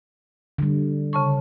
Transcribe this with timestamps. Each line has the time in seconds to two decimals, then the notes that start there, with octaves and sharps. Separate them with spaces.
0.58 D3 G3
1.13 C#3 A5 C#6